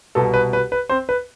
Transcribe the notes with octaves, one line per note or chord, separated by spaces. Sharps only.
C2 B2 B3 A4
B4
B4
B4
C4 C5
B4